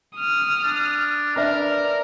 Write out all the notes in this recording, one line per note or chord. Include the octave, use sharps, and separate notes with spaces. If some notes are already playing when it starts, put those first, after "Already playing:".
D#6 F6
D4
D4 A#4 B4 D5 E5 F6